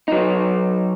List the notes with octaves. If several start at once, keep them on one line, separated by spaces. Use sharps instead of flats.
F#3 D#4